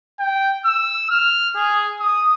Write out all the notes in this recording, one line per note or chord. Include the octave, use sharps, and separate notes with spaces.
G5
E6
F6
G#4
D#6